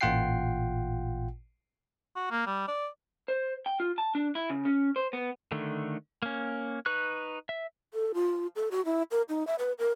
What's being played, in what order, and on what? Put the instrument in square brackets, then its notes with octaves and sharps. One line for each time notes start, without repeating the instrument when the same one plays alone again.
[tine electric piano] A1 A#2 F4 F#5 G5 C7
[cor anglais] F#4
A#3
G3
D5
[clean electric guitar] C5
G5
F4
A5
D4
E4
C#3
C#4
C5
B3
[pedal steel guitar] D3 D#3 A3
A#3 C#4
D#4 B4 C#6 F#6
E5
[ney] A4
F4
A4
F#4
E4
A#4
D#4
E5
B4
A#4